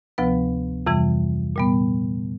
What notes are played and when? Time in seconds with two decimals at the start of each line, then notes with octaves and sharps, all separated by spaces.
0.18 D2 C3 F3 B3 B4
0.87 F2 C3 E3 G3
1.56 A#2 G3 B3